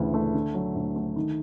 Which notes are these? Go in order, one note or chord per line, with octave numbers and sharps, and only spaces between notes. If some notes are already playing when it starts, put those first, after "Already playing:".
Already playing: D2 C#3 E3
A3
D3
F#3
D2
A3
D#3